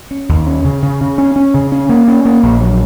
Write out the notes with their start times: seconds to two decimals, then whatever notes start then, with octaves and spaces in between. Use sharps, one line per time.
0.11 C#4
0.29 D#2
0.47 C#4
0.64 C#3
0.82 C#3
1.01 C#3
1.18 C#4
1.36 C#4
1.54 C#3
1.72 C#4
1.89 A#3
2.08 C#4
2.25 A#3
2.43 A#1
2.61 F#3